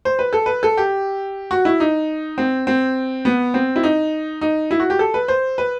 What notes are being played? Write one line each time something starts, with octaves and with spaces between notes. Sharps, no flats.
C5
B4
A4
B4
A4
G4
F#4
E4
D#4
C4
C4
B3
C4
E4
D#4
D#4
E4
F#4
G4
A4
B4
C5
B4